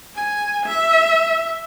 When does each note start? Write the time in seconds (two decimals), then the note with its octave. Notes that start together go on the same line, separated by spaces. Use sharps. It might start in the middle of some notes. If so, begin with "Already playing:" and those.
0.16 G#5
0.66 E5